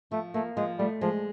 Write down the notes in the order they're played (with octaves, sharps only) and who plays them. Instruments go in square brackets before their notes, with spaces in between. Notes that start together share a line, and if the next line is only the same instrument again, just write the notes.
[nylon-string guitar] F3 [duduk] A3
[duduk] A3 [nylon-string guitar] A#3
[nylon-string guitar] F3 [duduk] G#3
[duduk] G3 [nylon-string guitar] A3
[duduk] F3 [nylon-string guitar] G#3